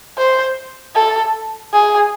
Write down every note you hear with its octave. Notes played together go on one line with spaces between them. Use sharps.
C5
A4
G#4